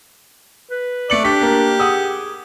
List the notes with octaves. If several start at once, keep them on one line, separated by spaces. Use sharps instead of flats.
B4
A3 D5 C#7 F#7
D4 G4 B6
A#3 A#4
G#4 F#5 D#6 E6